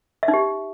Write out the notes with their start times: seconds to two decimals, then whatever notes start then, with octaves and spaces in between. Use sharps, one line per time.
0.23 E5
0.28 D#4
0.34 G4